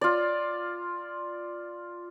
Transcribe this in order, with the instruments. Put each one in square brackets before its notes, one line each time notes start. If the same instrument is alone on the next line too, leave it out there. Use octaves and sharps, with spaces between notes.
[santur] F4 D5